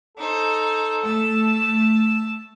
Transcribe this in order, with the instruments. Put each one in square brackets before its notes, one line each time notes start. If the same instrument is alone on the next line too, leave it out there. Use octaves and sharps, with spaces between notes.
[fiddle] D#4 C5 [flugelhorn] A4
[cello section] A3 [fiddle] A5 E6